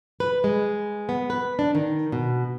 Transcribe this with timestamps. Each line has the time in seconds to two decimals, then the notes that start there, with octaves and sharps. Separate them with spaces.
0.20 B4
0.44 G#3
1.09 B3
1.30 B4
1.59 D4
1.75 D#3
2.12 B2